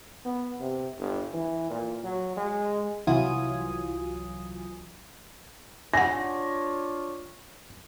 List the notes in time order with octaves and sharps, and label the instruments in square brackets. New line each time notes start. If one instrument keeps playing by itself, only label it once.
[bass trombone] B3
C3
G1
E3
A#2
F#3
G#3
[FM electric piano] C2 E3 F#3 F4 G#5 D#6
[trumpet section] D4 F4 C#5 [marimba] F#5 G#5 [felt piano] A#6